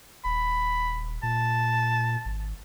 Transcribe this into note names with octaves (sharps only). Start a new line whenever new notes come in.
D#1 B5
A#2 A5
G#1